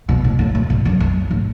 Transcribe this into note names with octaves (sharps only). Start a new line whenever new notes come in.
B2
A2
A2
B2
G#2
F#2
F#2
A2